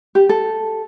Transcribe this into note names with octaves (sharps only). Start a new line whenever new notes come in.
G4
A4